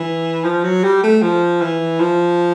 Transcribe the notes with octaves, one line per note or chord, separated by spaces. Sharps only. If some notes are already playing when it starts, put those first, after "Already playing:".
Already playing: E3
F3
F#3
G3
A3
F3
E3
F3